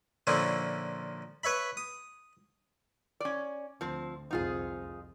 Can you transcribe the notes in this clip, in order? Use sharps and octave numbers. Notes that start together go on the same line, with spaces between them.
A#2 D3 F3 C#4 E4
B4 C#5 E5 B5
D#6
C#4 D5
D2 F3 C4
C2 F2 D#4 F4 G#4